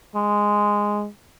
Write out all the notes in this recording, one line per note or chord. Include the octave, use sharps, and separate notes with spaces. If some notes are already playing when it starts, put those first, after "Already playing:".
G#3